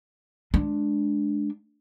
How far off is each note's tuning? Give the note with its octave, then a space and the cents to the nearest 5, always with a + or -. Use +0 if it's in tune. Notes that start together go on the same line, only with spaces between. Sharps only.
G#3 +25 D4 +0